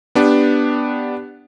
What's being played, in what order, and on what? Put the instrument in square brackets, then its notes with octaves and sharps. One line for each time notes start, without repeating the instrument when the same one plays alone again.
[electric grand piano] B3 D4 G4